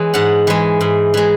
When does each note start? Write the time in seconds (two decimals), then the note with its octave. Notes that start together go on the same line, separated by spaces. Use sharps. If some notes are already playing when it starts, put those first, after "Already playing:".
Already playing: E3 G#3 C#5
0.14 G#2 F#5
0.47 E3 G#3
0.81 G#2
1.14 E3 G#3